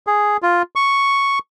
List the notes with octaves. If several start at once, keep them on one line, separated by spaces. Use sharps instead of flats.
G#4
F4
C#6